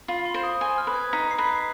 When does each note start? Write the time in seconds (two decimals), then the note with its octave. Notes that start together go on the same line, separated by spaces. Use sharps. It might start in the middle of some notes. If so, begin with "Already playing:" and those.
0.08 F4 B5
0.25 C6
0.34 C5
0.43 D#6
0.61 G#5
0.78 F6
0.87 B4
0.95 G#6
1.13 D#4 B6
1.31 C7
1.38 B4
1.48 C7